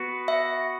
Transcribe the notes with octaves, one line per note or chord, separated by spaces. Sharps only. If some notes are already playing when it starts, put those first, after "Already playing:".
Already playing: B3 F#4 B4
E5